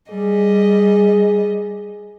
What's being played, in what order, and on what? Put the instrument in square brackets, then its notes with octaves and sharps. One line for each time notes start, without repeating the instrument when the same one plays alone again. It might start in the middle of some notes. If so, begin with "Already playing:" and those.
[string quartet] G3 D#5 [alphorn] G#4